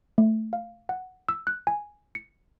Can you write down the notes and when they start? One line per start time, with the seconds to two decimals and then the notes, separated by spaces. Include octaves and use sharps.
0.18 A3
0.53 F5
0.89 F#5
1.29 E6
1.47 F#6
1.67 G#5
2.15 C#7